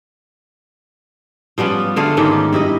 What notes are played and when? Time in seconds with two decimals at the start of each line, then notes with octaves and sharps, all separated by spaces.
1.58 F3 G3 B3 C#4
1.96 D3 A3 F4 G#4
2.17 G#2 D#3 C#4 G4
2.53 G2 E4 G4 D#5